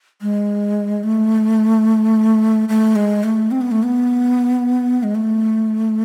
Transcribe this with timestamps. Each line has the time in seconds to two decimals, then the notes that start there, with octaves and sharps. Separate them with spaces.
0.22 G#3
1.03 A3
2.69 A3
2.96 G#3
3.24 A3
3.51 C4
3.61 B3
3.71 A3
3.83 B3
5.03 G#3
5.15 A3